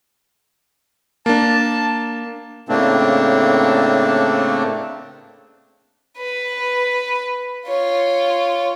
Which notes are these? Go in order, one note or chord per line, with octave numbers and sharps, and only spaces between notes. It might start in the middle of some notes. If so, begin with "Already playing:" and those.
A#3 D4 A5
A2 C#3 A3 A#3 C4 D4
B4
F4 C#5